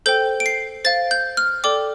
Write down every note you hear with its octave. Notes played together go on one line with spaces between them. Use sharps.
A4 C5 G5 G6
D7
C7
C5 F5 A6
G6
F6
A4 D5 G5 D6